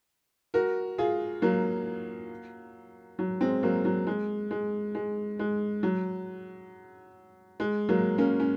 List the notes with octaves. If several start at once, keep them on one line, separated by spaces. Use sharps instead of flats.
F#4 A#4
F4 G#4
F#3 A#3
F#3
G#3 C4
F#3 A#3
F#3
G#3
G#3
G#3
G#3
F#3
G#3
F#3 A#3
A#3 C#4
C#4